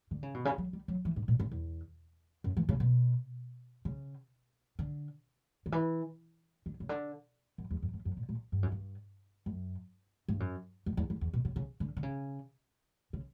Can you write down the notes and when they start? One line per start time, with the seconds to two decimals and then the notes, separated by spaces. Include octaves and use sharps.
0.11 D3
0.23 C#3
0.34 B2
0.45 C#3
0.58 F#3
0.73 G3
0.88 F#3
1.05 E3
1.16 G2
1.28 A#2
1.40 F#2
1.52 E2
2.44 F#2
2.57 E3
2.69 C#3
2.80 B2
3.85 C#3
4.79 D3
5.66 D3
5.72 E3
6.66 D3
6.80 C#3
6.89 D3
7.58 F#2
7.71 E2
7.83 F#2
7.93 F#2
8.05 F#2
8.17 A#2
8.29 A#2
8.52 G2
8.63 F#2
8.72 G2
9.46 F#2
10.28 G2
10.40 F#2
10.86 F#2
10.97 E2
11.10 E2
11.21 E2
11.34 B2
11.45 C#3
11.56 C#3
11.80 D3
11.97 D3
12.03 C#3
13.13 C#3